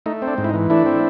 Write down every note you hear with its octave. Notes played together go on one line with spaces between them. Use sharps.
A3 D#4
C4
D4
G#2
E4
D#4
E3
A3 D4 E4
C4